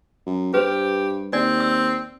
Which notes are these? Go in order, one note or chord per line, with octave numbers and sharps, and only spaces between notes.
F#2
G2 G4 B4 C5
D#2 C4 D5
E6